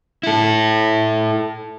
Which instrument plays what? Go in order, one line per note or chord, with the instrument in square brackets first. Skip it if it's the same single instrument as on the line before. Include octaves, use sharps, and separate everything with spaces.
[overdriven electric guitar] E4 A4